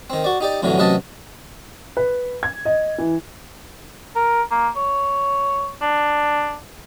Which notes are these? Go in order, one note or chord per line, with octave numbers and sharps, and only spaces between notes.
D#3 C4
F#4 D5
D#4 G4 D5
F2 A2 D3 E3 F#3
A1 C3 F#3 B4 D#5 A5
B4
G#6
D#5
E3
A#4
A#3
C#5
D4